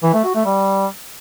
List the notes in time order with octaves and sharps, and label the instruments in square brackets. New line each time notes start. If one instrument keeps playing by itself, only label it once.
[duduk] E3
A3
F#4
A3
G3